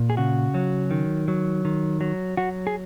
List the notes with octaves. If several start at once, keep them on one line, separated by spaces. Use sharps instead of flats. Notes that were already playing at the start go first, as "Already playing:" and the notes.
Already playing: A#2
G#4
C#3 F#4
F#3
D#3
F#3
D#3
F#3
F#3 F#4
G#4